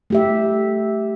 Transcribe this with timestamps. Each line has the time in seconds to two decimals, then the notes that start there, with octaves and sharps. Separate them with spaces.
0.10 A3 G4 E5